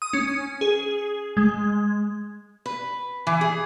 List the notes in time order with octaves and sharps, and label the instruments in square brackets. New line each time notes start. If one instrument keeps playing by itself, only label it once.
[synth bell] D#6
C#4
G#4
G#3
[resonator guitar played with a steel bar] B4
E3
G#4